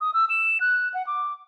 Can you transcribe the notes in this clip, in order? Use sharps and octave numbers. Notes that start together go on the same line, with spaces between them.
D#6
E6
E7
F#6
F#5
D6